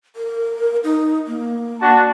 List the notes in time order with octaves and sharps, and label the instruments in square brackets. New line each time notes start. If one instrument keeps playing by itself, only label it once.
[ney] A#4
D#4
A#3
[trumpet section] D4 F#4 A5